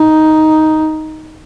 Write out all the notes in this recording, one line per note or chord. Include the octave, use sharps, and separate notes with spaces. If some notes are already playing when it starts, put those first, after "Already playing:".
Already playing: D#4